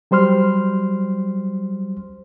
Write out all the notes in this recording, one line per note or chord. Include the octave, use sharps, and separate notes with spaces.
F#3 G3 C5 C6 F6